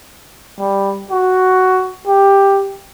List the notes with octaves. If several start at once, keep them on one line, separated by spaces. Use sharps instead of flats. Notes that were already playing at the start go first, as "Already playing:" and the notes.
G3
F#4
G4